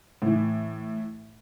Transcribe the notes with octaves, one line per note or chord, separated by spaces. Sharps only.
A2 E3